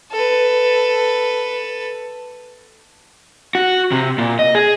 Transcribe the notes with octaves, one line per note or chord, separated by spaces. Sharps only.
A4 B4
F#4
C3
A#2
D#5
G#4